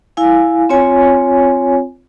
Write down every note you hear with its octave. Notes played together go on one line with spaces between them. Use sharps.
E4 F5 G#5
C4 F4 C#5 G#5